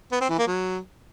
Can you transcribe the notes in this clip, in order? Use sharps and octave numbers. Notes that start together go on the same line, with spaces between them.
B3
C4
E3
A#3
F#3